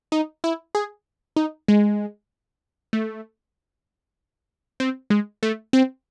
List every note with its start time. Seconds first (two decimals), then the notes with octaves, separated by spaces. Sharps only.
0.12 D#4
0.44 E4
0.75 G#4
1.36 D#4
1.68 G#3
2.93 A3
4.80 C4
5.10 G#3
5.43 A3
5.73 C4